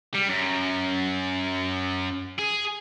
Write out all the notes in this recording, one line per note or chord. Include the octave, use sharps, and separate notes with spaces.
G3
F#2
G#4